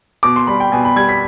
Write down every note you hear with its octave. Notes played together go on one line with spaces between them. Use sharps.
B2 D6
C6
G3 B5
G5
B2 G#5
B5
G3 G#6
B6